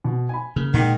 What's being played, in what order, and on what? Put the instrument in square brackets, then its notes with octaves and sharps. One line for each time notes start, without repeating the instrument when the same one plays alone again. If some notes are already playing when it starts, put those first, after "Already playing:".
[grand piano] B2
G#5 B5
[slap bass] C#3 [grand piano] A#3
[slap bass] A#2 G#3 [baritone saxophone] D#3 [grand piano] F#5 G5